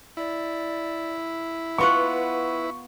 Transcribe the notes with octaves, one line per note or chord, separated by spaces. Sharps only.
E4 D5
B3 F4 B4 F#5 C#6